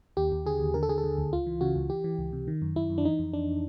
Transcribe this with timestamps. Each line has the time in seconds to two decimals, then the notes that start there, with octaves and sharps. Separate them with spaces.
0.17 D#2 G4
0.32 D#2
0.46 D3 G#4
0.60 D#2
0.74 D3 A#4
0.83 A4
0.89 D3 G#4
0.98 A4
1.04 D3
1.18 D2
1.32 C#2 F4
1.46 E3
1.61 C#3 F#4
1.75 C#2
1.90 E3 G4
2.04 E3
2.18 C#2
2.33 C3
2.48 D#3
2.62 F#2
2.76 F#2 E4
2.90 F#2
2.98 D4
3.05 E3 D#4
3.19 F2
3.33 F2 D4